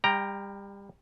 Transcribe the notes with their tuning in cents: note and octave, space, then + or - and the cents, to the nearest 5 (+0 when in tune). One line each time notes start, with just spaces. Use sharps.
G3 +30 G5 +0 A#5 +0